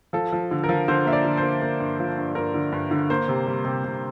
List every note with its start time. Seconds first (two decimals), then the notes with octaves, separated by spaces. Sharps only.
0.13 F3 A4
0.32 F3
0.51 D3
0.64 A#4
0.69 F3
0.88 D3 C5
1.06 A#3 E5
1.13 D5
1.25 D3
1.37 C5
1.43 A#3
1.62 A#3
1.80 G2
1.99 F3
2.18 G2
2.35 G2 A#4
2.54 D3
2.72 G2
2.91 D3
3.10 A#3 C5
3.28 C3
3.46 G3
3.65 C3
3.84 C3